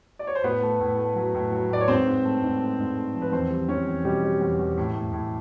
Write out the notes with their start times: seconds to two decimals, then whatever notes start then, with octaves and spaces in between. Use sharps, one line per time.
0.19 D5
0.27 C#5
0.35 C5
0.43 A2 B3 B4
0.62 A3
0.80 A2
0.98 A3
1.16 F#3
1.34 A2
1.52 F#3
1.70 A2 D5
1.81 C#5
1.88 G#2 C4 C5
2.06 G#2
2.24 A3
2.42 G#2
2.60 A3
2.78 G#2
2.97 A3
3.14 F3
3.22 B4
3.32 E2 C4 C5
3.50 G3
3.68 E2 C#4 C#5
3.87 E2
4.04 B2 G3 G4
4.23 G3
4.41 E2
4.59 E2
4.77 A2
4.95 A2
5.13 A2